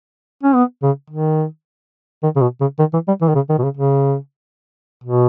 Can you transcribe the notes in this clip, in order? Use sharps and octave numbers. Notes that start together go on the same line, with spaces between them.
C#4
B3
C#3
D#3
D#3
C#3
B2
C#3
D#3
E3
G3
E3
D#3
C#3
D#3
B2
C#3
C#3
B2